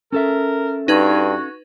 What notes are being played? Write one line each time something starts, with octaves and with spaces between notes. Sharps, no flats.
C#4 A4 A#4 E5
G2 D#4 F#4 B4 G#6